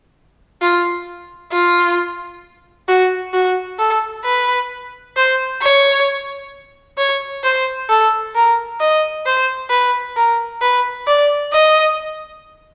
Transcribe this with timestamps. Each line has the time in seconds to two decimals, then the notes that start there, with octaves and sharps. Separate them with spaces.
0.62 F4
1.52 F4
2.88 F#4
3.33 F#4
3.79 A4
4.24 B4
5.17 C5
5.61 C#5
6.98 C#5
7.43 C5
7.89 A4
8.35 A#4
8.80 D#5
9.26 C5
9.70 B4
10.17 A#4
10.61 B4
11.07 D5
11.53 D#5